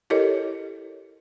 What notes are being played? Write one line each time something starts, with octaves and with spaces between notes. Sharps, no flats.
E4 G4 A4 A#4 C#5 D#5